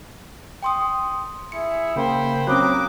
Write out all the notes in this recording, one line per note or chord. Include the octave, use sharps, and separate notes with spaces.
G5 C6 D#6
E4 G#4 E5 C#7
C#3 A#3 C5 G5 B5
F#3 A#3 C4 C#4 D6 D#6 F#6